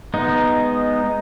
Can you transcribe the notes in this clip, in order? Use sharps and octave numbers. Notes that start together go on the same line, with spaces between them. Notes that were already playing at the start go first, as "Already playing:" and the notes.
G#3 B3 D#4